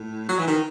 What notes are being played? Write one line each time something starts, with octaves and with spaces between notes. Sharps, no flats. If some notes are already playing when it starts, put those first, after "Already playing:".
Already playing: A2
F#3
E3
D#3